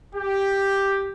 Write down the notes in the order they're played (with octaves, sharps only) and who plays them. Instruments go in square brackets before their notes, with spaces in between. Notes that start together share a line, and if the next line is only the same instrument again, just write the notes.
[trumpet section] G4